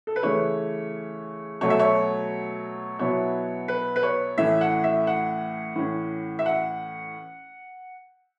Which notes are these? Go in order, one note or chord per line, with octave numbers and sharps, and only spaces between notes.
A4
B4
C#3 E3 A3 C#5
B2 F#3 A3 C#5
E5
C#5
B2 F#3 B3 E4 C#5
B4
B4
C#5
A2 E3 A3 C#4 E5
F#5
E5
F#5
A2 E3 C#4
E5
F#5